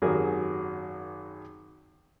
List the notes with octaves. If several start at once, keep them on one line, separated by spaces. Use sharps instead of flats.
G#1 F#2 F#3 G4 G#4 A#4